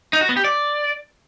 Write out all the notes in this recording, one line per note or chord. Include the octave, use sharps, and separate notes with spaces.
D#4
F#4
B3
G4
D5